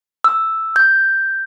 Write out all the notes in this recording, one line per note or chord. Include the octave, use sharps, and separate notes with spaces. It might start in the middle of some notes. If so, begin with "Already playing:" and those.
E6
G6